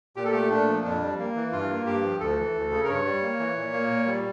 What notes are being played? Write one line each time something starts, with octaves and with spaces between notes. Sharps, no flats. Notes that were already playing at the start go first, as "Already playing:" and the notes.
A#2 G4
A4
A3 G4
A#2 D4
F3
F2 D4
G3
A#3
E3
G2 F4
A#3
G2 G4
F3
D2 A4
E3
D2
C#3
A#4
G2 C#5
G3
A#3
E3
A#2
A#3
A#2
G3